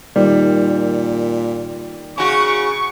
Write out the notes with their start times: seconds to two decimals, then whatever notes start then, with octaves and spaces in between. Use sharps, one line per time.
0.16 A#2 D#3 G3
2.18 C#3 F#4 C#6